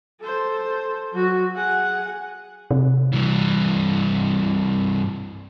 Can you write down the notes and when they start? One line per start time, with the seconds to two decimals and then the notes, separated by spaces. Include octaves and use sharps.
0.20 A4 C5
1.13 F#3 F#4
1.56 G#4 F#5
2.71 C3
3.12 G2 E3